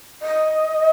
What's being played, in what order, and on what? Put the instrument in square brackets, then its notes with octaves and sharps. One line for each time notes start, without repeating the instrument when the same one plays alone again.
[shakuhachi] D#5